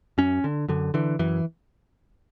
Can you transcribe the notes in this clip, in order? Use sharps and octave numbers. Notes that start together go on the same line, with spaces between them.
F#2 C#4
D3
F#2 D3
D3 E3
F#2 E3